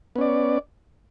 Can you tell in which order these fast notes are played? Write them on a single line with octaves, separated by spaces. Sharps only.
B3 C#4 D5